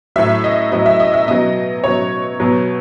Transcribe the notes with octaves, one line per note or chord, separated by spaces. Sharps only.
A2 F#3 E5
D#5
A2 F#3 D#5
E5
D#5
E5
B2 F#3 D#5
B2 F#3 C#5
B2 F#3